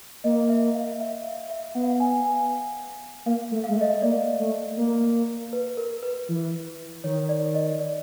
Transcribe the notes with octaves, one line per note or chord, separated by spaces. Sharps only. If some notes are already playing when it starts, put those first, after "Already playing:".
A#3 D#5
E5
F5
E5
E5
E5
B3 F#5
F5
F#5
G#5
G#5
A#3 F5
A3
F5
G#3
A3 E5
D#5
E5
A#3 D5
A3
A#3
B4
A#4
B4
E3
D#3 C#5
D5
D#5
D5